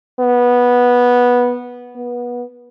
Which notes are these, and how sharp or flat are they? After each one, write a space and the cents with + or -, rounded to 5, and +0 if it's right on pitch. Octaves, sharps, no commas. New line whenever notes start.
B3 -10
B3 -25